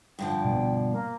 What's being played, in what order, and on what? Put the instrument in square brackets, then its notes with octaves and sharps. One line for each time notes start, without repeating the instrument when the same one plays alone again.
[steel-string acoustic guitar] G2 D3 F3 [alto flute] G5
[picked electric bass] B2 G3 B3
[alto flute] A#3